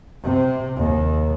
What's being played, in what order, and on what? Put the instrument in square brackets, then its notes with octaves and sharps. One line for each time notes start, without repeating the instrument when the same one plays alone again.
[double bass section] C3
D#2